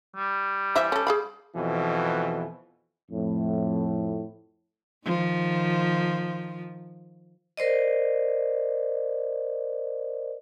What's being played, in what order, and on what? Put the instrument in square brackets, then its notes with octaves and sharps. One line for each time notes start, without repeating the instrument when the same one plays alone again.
[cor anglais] G3
[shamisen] E3 C5 E5
C#4 A4
G#4 F5 B5
[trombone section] F2 B2 E3
[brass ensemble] F2 A2
[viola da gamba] D#3 F3
[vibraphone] A#4 C5 D5 D#5